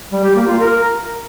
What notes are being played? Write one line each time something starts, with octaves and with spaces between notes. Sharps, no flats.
G3
G4
A#3
F4
A#4